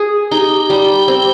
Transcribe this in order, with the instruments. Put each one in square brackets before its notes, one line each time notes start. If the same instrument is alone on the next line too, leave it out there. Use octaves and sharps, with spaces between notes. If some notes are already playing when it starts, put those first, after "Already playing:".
Already playing: [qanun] G#4
[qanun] D#4 [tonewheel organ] G4
[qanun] G3
C4